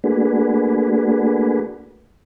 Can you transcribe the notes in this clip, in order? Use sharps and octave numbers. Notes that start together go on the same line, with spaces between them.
A3 A#3 D4 F#4 G#4 B4